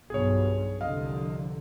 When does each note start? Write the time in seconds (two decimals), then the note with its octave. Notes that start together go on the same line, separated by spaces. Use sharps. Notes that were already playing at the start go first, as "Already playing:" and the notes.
0.10 B1 G2 B2 G#4 C#5
0.81 C2 F2 D3 D#5 F5